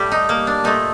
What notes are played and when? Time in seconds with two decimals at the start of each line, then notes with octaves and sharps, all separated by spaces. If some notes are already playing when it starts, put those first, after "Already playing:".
Already playing: A2 G3 G4
0.12 D#4
0.29 A#3
0.47 D4
0.64 A#2 A3 D#4